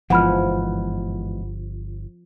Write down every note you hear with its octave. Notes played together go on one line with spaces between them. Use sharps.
G1 G#2 B2 E3 F3 F#5 B5 F6